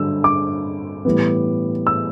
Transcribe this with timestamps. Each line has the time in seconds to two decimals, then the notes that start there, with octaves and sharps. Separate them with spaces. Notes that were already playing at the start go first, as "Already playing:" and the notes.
Already playing: G2 D3 F#3 E6
0.24 D6
1.05 A2 E3 G3 B3
1.87 E6